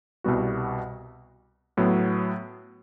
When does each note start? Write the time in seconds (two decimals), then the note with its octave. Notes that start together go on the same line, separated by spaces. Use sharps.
0.24 C2 B2 G3 B3 F#4
1.77 A2 F#3 B3